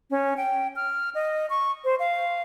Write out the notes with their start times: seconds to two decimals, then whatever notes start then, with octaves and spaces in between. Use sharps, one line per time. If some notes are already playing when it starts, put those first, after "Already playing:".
0.11 C#4
0.37 G5
0.76 F6
1.15 D#5
1.50 C#6
1.84 C5
1.99 F5